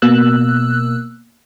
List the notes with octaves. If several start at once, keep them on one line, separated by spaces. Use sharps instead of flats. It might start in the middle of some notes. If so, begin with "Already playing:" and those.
B2 A#3 E6 F#6